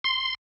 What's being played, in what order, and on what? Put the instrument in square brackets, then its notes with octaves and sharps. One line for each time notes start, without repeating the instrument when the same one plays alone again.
[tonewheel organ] C6